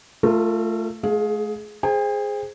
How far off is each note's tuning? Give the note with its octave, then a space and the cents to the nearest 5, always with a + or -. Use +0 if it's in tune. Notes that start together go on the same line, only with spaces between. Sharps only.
A3 +0 F4 -5 A#4 -40
A3 -40 G#4 +15 F5 +25
G#4 +0 C5 +0 G5 +45